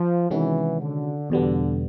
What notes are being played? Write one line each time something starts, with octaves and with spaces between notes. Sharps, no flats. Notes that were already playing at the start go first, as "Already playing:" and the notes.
Already playing: F3
C3 D#3 E3 G#3 C#4 F#4
D3
E2 B2 D3 G3 B3